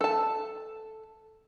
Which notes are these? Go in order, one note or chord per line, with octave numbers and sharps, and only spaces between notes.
A4 A5